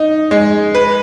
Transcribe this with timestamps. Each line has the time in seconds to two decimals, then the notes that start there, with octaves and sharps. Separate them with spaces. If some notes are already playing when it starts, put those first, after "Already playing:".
Already playing: D#4
0.31 G#3
0.75 B4